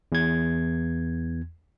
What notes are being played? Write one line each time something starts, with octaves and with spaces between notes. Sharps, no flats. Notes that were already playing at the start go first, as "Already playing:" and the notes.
E2 G#6